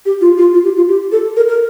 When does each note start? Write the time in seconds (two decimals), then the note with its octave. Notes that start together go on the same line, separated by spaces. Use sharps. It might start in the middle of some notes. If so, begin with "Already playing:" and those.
0.06 G4
0.21 F4
0.38 F4
0.54 F4
0.64 G4
0.77 F4
0.89 G4
1.12 A4
1.37 A#4
1.48 A#4